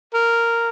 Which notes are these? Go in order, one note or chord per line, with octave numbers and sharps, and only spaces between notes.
A#4